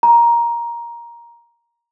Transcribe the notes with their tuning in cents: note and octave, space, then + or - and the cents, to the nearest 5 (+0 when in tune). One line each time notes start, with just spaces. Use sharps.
A#5 +10